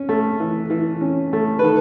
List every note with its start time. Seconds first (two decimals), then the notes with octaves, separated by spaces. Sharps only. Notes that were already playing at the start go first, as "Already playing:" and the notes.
Already playing: C#4
0.09 A3
0.40 E3
0.70 E3
1.01 C#4
1.33 A3
1.59 B4
1.63 D#3 A4